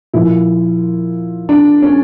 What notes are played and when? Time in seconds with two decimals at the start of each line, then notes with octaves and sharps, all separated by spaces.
0.13 A#2 F3 E4
1.49 D4
1.82 C#4